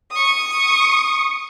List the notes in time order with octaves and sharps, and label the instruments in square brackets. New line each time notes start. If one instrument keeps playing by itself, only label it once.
[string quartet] C#6 D#6